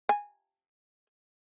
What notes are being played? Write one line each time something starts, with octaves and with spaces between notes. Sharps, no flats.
G#5